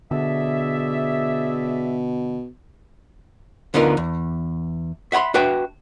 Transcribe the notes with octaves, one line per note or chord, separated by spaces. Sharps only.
B2 D3 G#4 D5 E5
D2 D3 B3 D#4 F4 A#4
E2
E5 F#5 G#5 B5 C6
D4 F#4 B4 E5 G5